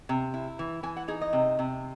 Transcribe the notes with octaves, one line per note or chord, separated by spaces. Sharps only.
C3
E4
E3
E3 G#5
F#5
D#4 G#4
D#5
C3
C3